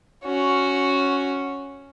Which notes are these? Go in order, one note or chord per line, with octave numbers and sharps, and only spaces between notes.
C#4 F#4